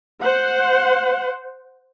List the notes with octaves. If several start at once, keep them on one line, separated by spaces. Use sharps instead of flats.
C5 F#5